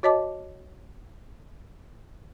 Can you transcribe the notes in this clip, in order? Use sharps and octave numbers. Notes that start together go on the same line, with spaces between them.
F#4 C#5 D#5 A5 D6